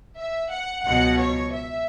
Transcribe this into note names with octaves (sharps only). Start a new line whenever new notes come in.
E5
F#5
C#2 B2 F#3 F#5
C#5
E5